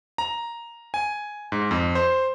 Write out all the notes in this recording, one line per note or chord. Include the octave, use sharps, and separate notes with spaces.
A#5
G#5
G#2
F2
C5